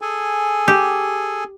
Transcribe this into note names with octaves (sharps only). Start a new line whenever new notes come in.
G#4 A4 G#5
G4